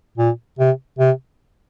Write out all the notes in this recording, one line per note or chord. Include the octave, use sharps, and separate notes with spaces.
A#2
C3
C3